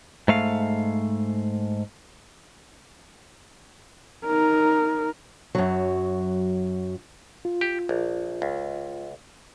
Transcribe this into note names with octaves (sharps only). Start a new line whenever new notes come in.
G#2 A3 F5
D#4 A#4
F#2 F#3
F4
G4
A#1
C#2